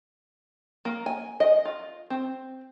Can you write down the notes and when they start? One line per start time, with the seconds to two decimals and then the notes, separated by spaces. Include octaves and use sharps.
0.85 A#3
1.06 G#5
1.40 D#5
1.65 F4
2.10 C4